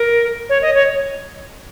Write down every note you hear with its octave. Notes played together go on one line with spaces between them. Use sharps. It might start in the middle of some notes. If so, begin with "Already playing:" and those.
Already playing: A#4
C#5
D#5
C#5